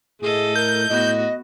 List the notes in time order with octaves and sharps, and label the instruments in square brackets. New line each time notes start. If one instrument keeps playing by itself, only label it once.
[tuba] A2 [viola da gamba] A3 A4 D#5 [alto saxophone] G#4
[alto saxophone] A#4 [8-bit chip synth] G6
[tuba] A2 [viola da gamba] B3 F#4 [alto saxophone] D#5